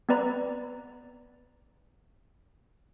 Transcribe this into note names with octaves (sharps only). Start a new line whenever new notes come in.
B3 C4 B4 D5 A#5 B5